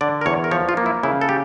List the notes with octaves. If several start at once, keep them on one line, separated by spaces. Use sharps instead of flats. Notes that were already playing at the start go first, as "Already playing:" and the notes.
D3 D5
A#4
E2 C#5
A#4
F3 C#5
F4
A#3
E4
C#3 E4
A4
G4